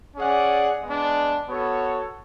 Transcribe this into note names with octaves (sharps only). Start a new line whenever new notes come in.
C#4 G#4 D5 F#5
G#3 B3 D4
B3 F#4 A4 C#5